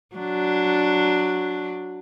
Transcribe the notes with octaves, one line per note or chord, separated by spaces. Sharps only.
F#3 D4